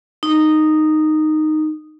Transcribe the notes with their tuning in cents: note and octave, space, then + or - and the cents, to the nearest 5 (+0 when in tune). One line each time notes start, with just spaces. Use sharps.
D#4 -10